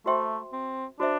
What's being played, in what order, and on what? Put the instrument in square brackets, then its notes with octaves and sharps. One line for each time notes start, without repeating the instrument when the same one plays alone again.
[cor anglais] A3 [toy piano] F#4 C5 E5 G5 C6
[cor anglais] C4
[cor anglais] D4 [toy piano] F#4 C5 E5